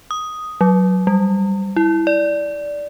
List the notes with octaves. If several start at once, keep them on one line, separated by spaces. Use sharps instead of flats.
D#6
F#3
G3
E4
D5